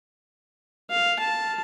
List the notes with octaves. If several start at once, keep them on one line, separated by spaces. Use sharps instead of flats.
F5
A5